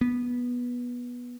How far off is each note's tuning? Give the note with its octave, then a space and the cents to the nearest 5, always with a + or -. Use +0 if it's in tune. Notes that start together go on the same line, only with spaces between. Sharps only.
B3 -15